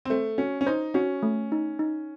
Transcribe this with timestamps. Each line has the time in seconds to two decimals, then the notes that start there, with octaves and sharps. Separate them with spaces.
0.05 C4
0.10 A3 C5
0.38 C#4 F#4
0.61 C#4
0.66 D#4 C5
0.94 C#4 F#4
1.23 A3
1.52 D#4
1.79 D#4